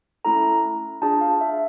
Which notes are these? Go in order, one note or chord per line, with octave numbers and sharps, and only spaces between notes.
A3 C#4 E4 A4 A#5
D4 F4 G#4 A5
F5
E5